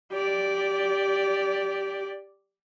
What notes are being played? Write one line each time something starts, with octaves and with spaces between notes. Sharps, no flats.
G4 D5